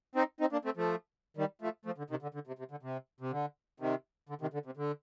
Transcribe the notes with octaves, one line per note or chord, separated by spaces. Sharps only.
C4 D#4
C4 D#4
A#3 D4
A3 C4
F3 A3
D#3 G3
F3 A3
F3 A3
D3
C3 D#3
D3
D3
C3
C3
D3
C3
C3
D3
C3 D#3
D3
C3 D#3
D3
C3
D3